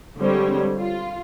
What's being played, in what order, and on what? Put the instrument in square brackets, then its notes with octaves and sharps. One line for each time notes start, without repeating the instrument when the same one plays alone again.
[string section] D3 G3 G#3 C4 C5 C#5
F4